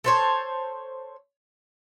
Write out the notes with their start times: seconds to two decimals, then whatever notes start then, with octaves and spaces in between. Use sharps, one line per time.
0.04 A4 C5 C#5